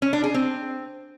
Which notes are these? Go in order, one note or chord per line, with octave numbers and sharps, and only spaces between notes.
C#4
D4
G#4
C4